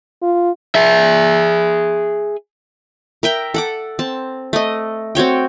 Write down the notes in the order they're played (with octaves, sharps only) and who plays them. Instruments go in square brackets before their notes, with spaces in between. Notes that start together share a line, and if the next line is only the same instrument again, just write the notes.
[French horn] F4
[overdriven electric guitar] G#4 E5
[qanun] A#4 E5 G5
A4 F#5 D6
C4 A5
A3 D#5
C4 F#4 C#5 G5